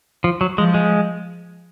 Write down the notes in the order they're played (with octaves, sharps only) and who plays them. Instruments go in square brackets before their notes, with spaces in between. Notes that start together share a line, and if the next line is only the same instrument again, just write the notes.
[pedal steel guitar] F3
F#3
[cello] F3 [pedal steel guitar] G#3
[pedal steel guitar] G#3